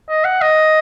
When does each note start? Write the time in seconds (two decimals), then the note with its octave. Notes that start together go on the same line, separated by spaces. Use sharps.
0.09 D#5
0.24 F#5
0.41 D#5